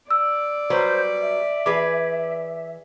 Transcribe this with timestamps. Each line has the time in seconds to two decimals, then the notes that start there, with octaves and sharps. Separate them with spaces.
0.11 D5 E6
0.70 F#3 G3 B4 C5
1.21 E5
1.66 E3 G#4 B4 D6